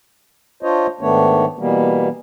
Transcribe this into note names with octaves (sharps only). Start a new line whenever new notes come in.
D4 F4 C5 C#5 D#5
G#2 D#3 A3 B3 D4 C#5
B2 E3 G3 A#3 B3